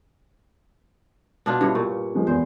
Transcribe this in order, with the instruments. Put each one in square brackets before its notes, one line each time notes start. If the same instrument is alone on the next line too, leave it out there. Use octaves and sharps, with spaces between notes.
[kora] B2 D4 F4
[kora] G2 C#5 [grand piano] E4
[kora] A#2 [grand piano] C#6
[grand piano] F3 G#3
[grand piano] E2 [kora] C5